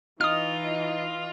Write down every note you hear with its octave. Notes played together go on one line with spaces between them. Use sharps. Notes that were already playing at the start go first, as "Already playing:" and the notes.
E3 D#4 F4 D#5 D#6 F6